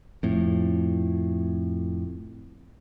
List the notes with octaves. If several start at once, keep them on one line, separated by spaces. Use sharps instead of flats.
F2 A2